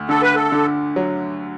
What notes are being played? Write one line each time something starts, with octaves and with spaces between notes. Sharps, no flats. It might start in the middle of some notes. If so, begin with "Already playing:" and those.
Already playing: D2
D3 A4
B4
A4
D3
F#3